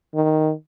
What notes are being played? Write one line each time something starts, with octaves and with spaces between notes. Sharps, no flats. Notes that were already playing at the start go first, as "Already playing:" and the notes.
D#3